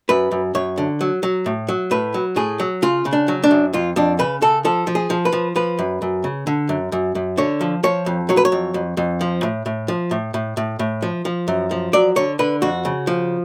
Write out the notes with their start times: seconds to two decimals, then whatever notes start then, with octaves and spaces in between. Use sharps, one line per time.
0.09 F#2 B4
0.31 F#2
0.55 F#2 C#5
0.78 D3
1.01 F#3
1.23 F#3
1.46 A2
1.68 F#3
1.91 A2 B4
2.14 F#3
2.36 A2 G#4
2.60 F#3
2.82 C#3 F4
3.05 C#3
3.13 D4
3.28 F#3
3.44 D4
3.51 F#2
3.73 F2 F4
3.96 F2 D4
4.19 C#3 B4
4.42 C#3 A4
4.65 F3 A4
4.87 F3
4.95 G#4
5.10 F3
5.25 B4
5.33 F3
5.56 F3 B4
5.79 F#2
6.02 F#2
6.24 C#3
6.47 D3
6.69 F#2
6.92 F#2
7.15 F#2
7.37 D3 C#5
7.61 F3
7.83 F3 C#5
8.06 F2
8.29 F#3 C#5
8.37 B4
8.45 C#5
8.52 F2
8.74 F2
8.97 F2
9.21 F3
9.43 A2
9.66 A2
9.88 F3
10.11 A2
10.34 A2
10.57 A2
10.79 A2
11.02 F3
11.25 F3
11.48 F#2
11.71 F3
11.93 F#3 D5
12.16 D3 C#5
12.39 D3 B4
12.62 F2 F#4
12.85 C#3
13.07 F3